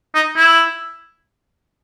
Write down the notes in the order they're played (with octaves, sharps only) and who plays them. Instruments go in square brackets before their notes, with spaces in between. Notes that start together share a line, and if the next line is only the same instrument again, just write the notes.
[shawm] D#4
E4